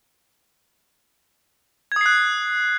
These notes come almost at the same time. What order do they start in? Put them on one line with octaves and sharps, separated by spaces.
G#6 D#6 C7 F#6